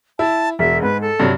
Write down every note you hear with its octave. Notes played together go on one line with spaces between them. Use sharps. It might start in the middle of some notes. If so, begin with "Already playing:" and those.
E4 A5
E1 E5
G#2 B4
A4
G2 C3 F#3